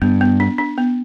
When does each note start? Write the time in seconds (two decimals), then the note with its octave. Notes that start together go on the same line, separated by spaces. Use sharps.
0.02 G2 B3
0.21 B3
0.40 D4
0.58 D4
0.78 B3